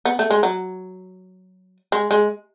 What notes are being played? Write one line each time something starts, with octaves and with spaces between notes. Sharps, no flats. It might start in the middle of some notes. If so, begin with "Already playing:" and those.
B3
A3
G#3
F#3
G#3
G#3